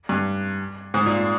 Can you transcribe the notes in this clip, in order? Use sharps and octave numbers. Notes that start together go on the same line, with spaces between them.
G2
G#2
A#2